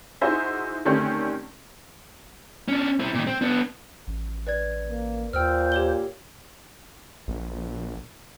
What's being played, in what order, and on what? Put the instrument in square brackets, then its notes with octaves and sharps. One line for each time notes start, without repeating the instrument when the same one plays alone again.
[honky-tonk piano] D#4 E4 F#4 G#4 C5 E5
D3 D#3 A3 C4 C#4 G4
[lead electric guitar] C#4 D4
C4 E4
A#2 D#3
C4
B3 D4
[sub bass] A1
[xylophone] B4 D5 G#6
[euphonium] A#3
[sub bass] D#2 [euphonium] A#2 [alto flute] C5 [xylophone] G5 E6 F6
[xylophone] G4 C#5 G7
[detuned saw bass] A#1